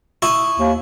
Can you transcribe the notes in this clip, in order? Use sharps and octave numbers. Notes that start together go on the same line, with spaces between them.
E4 C#6 D#6
D#2